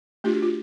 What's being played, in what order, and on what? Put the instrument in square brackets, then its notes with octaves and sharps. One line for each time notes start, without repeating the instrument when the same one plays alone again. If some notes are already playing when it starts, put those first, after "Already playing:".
[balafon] A3 D4 F4 G4
F#4
F4